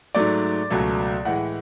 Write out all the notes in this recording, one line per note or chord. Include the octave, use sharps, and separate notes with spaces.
G#2 F#3 A3 D5
C#2 B2 F#3 A3
A2 E3 G#3 F#5